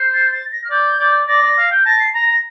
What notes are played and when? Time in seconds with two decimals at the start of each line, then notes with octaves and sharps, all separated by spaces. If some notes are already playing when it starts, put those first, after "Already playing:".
Already playing: C5
0.13 A6
0.32 A6
0.52 A#6
0.64 F6
0.70 D5 G6
1.00 D5
1.28 D5 A#6
1.42 D5
1.58 F5
1.71 G5
1.85 A5 A#6
2.00 C7
2.14 A#5 A#6
2.29 A#6